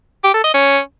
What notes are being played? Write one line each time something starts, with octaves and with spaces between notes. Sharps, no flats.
G4
A4
D#5
C#4